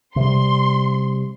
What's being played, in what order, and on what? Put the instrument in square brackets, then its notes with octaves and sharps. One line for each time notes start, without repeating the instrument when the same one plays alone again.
[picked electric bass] C3 G3 [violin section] C6